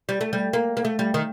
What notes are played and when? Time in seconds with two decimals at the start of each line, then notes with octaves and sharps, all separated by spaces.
0.09 G3
0.21 A3
0.33 G3
0.53 A#3
0.77 A#3
0.85 A3
0.99 G3
1.14 D#3